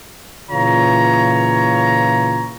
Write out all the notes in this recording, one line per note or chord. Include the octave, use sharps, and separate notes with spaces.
A#2 C#3 E3 F4 C#5 A#5